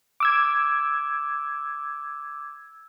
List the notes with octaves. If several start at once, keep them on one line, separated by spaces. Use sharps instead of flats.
D6 E6 G#6